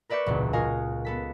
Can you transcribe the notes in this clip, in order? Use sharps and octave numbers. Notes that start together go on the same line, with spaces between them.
A#4 B4 D5 E5 C#6 G6
E1 C#2 A#2
F4 F#4 A#4 D#5 F5 G#5
B3 A4 B6